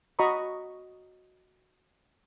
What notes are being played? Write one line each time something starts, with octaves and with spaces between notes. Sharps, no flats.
F#4 D#5 A#5 B5 C#6 D#6